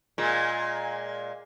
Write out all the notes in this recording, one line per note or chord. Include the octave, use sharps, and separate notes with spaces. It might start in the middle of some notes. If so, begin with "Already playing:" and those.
A#2 G#3